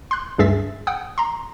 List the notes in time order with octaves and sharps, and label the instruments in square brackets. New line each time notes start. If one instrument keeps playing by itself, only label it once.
[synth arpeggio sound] C6 F#6
D2 G2 G#4 E5 A6 B6
F#5 G5 D#6
A#5 C6